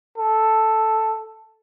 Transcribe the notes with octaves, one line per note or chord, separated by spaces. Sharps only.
A4